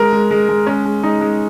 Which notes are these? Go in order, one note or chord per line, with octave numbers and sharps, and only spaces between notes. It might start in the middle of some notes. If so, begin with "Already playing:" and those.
Already playing: G#3 A#4
G#3
G#3
G#3
G#3 C#4
G#3
G#3 D#4
G#3